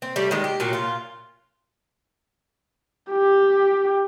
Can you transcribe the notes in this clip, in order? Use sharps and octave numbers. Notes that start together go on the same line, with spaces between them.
C4
G3 A3
D#3 G#3
G4
A#2 F#3 A#3
A#2 F4
G4